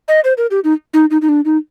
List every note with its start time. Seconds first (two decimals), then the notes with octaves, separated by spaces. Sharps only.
0.08 D#5
0.24 C5
0.38 A#4
0.51 G4
0.64 D#4
0.94 D#4
1.11 D#4
1.22 D#4
1.29 D4
1.45 D#4